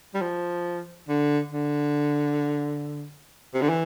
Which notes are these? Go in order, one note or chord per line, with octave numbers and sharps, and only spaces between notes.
G3
F3
D3
D3
C3
D3
E3